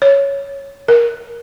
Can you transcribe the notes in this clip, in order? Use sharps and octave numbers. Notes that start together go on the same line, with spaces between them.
C#5
A#4